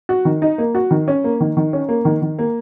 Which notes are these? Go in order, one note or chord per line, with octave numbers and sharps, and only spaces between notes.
F#4
D#3
D#4
A#3
F#4
D#3
C#4
A#3
D#3
D#3
C#4
A#3
D#3
D#3
A#3